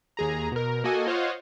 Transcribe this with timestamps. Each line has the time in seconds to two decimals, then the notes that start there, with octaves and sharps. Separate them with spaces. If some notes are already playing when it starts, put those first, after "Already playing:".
0.17 D#2 G#4 A#5
0.52 B2 A#4
0.84 A#3 F#4 A4 D#5 G#5
1.07 F4 C5 C#5 D#5 F5 F#5